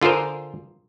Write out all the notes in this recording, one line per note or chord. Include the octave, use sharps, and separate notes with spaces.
D3 F4 G#4 A#4 C5